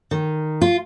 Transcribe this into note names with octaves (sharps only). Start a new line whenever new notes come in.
D#3
F4